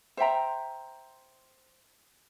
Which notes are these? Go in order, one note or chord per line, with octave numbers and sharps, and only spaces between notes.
C5 E5 G5 A#5